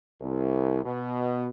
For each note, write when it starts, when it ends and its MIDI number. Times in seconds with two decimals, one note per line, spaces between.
0.21 0.82 36
0.84 1.47 47